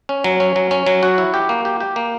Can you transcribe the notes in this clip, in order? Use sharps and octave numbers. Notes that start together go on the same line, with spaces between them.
C#4
F#3
C#4
F#3
C#4
F#3
F#4
E4
G4
A#3
G4
G4
A#3